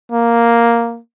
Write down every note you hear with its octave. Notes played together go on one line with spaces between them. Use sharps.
A#3